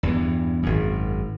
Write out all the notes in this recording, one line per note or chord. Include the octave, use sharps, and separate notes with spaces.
E2 G2 E3
G#1 F#2